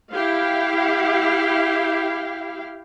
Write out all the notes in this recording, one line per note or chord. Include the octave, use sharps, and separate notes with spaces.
E4 G4 F5